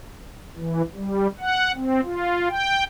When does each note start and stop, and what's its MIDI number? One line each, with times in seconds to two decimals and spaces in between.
0.57 0.82 52
0.95 1.27 55
1.39 1.72 78
1.75 2.00 60
2.04 2.49 65
2.49 2.84 79